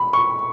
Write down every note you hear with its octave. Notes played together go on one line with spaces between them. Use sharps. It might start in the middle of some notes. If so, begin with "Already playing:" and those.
Already playing: B5
C#6